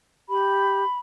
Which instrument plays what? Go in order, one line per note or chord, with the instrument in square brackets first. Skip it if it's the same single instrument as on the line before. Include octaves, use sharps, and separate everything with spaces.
[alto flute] G4 [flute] B5